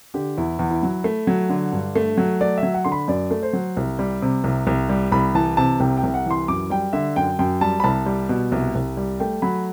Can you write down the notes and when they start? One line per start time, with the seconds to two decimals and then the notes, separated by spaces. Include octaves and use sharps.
0.14 D3 G4
0.37 E2 E4
0.59 E2
0.71 E4
0.83 F#3
1.04 A3
1.27 F#3
1.50 D3
1.73 G2
1.96 A3
2.17 F#3
2.41 A3 D5
2.58 E5
2.63 F#3
2.74 F#5
2.85 D3 C6
2.92 B5
3.08 F#2 D5
3.31 A3
3.43 C5
3.53 F#3
3.77 C2
3.99 G3
4.22 C3
4.44 C2
4.67 C2
4.89 G3
5.12 C2 B5
5.35 E3 A5
5.57 C3 A5
5.80 C2 G5
5.97 G5
6.03 C2
6.14 F#5
6.26 E3 C6
6.48 F#2 D6
6.70 G3 G5
6.93 D3 E5
7.16 F#2 G5
7.39 F#2 G5
7.61 G3 A5
7.80 B5
7.84 C2 A5
8.06 G3
8.29 B2
8.52 C2
8.75 C2
8.97 G3
9.20 A3 G5
9.42 F#3 B5